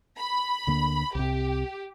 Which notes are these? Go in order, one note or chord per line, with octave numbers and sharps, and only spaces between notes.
B5
D2 D3 A#3
C2 C3 G4